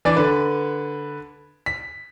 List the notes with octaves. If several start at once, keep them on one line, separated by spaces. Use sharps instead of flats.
E3 D4 D5
D3 B4
B6